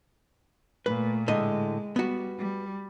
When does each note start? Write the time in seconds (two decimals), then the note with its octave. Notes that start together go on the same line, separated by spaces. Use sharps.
0.86 A#2 A3 B4
1.28 A2 D3 G#3 D#5
1.96 G3 B3 F#4
2.38 G3